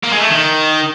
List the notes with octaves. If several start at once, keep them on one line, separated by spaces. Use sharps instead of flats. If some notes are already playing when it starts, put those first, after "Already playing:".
A#3
G#3
A3
D#3